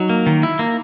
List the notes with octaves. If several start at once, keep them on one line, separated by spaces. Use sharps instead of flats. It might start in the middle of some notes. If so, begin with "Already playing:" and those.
Already playing: F#3 D#4 F#4
A#3
D#3
E4
A#3